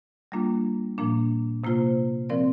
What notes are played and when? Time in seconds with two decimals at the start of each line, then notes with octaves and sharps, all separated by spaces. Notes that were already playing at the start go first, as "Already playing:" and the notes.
0.32 G3 A#3 D4 F4
0.98 A#2 F3 A#3 D4
1.64 C3 A#3 F4 C5
2.29 F3 C4 A#4 D5